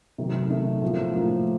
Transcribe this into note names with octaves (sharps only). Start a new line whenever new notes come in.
C3 D#3 F#3 A3
C3 D#3 F#3 A3
A2 F3 A#3
A2 F3 A#3